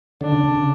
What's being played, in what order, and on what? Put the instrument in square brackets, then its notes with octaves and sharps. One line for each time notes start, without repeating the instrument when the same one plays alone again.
[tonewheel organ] D3 [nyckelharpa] D4
[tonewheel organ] C#3
C#3